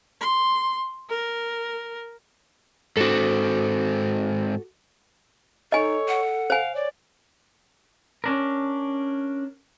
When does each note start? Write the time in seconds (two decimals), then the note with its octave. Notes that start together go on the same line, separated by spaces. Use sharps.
0.21 C6
1.09 A#4
2.97 G#2 C4 F#4 A4
5.72 D#4 A4 C#5 D#5 G#5
6.08 F#5
6.50 C5 F5 G#5
6.74 C#5 D5
8.24 C#4 D4 A#4